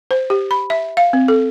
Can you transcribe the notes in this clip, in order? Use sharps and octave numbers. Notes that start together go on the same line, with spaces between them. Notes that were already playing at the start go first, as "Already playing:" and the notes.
C5
G4
B5
E5
F5
C4
A4